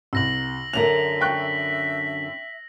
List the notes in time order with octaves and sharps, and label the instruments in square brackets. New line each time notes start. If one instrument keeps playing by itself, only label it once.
[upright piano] C2 [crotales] E6 A#6 F#7
[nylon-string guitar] F#2 D3 A#4 [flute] E5 [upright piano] F7
[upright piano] G5 C#6 F#6